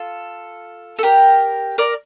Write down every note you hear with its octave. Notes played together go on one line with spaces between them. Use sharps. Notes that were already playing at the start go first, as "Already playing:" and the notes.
Already playing: F4 A4
A4
G4 A#4
A#4 D5